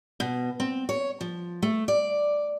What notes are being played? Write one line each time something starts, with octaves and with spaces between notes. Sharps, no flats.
B2
C4
C#5
F3
A3
D5